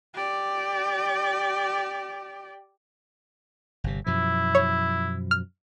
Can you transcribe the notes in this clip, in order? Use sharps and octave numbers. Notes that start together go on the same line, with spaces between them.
G4 D5
G1 C3
F#2 B2 F3 E4
C#5
F6